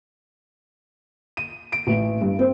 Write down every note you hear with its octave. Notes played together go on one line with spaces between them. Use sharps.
D#7
D7
A1
G2
C4